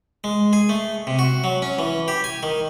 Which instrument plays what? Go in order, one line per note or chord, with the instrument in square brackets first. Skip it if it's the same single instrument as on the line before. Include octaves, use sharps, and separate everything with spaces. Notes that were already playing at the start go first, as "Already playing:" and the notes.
[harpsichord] G#3
G#4
A3
C3
F#4
F#3
C#4
E3
G4
G#5
D#3